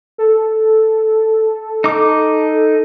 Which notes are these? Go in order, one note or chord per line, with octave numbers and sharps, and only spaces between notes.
A4
D#4 D6